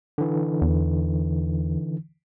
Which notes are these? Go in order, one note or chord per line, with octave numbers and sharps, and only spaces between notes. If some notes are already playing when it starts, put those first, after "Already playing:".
D3 E3
E2